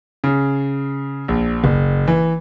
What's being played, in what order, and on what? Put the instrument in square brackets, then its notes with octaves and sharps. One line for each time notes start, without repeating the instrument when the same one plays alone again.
[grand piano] C#3
A#1
F#1
E3